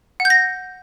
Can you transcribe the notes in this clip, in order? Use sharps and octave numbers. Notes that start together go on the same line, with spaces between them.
F#5
G6
A#6